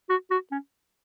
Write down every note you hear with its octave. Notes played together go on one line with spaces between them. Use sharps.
F#4
F#4
C#4